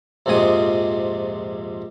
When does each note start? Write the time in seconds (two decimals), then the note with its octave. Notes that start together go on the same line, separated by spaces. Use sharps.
0.26 A#1 F2 G#2 C3 G#4 D#6